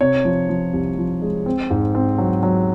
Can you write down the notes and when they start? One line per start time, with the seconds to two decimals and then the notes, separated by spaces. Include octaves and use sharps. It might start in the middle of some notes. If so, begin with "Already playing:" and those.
0.01 C3 C#5
0.25 F3
0.49 F3
0.73 C2
0.98 F3
1.22 G#3
1.46 C4
1.70 G#2
1.95 C4
2.18 F#3
2.43 F#3